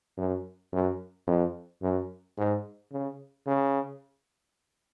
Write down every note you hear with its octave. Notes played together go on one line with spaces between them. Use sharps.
F#2
F#2
F2
F#2
G#2
C#3
C#3